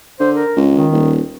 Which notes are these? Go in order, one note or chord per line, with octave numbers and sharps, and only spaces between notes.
D3 C5
A#4
C#2
D#3
D#1